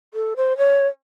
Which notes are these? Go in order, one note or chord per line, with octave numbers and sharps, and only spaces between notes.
A4
C5
C#5